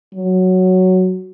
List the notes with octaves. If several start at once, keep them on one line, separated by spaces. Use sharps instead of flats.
F#3